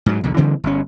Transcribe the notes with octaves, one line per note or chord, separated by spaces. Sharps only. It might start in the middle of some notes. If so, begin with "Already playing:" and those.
G#2 F#3
B1 E2 D3
C#3 E3 G3 C4
G1 C#4